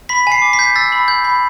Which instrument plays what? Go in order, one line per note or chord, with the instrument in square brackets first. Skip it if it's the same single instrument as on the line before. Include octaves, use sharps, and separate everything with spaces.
[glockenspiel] B5 B6
G#5 C7
D6
B6
G6
E6 A6
B5
G6
B5